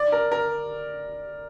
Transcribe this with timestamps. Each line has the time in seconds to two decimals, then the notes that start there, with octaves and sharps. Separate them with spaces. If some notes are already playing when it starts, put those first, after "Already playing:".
Already playing: D5
0.12 A#4
0.32 A#4